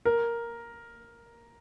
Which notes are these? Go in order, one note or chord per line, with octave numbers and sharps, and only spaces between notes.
A#4